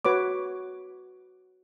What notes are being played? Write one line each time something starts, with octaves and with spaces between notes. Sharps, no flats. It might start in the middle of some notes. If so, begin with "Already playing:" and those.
F#4 B4 C#5 D6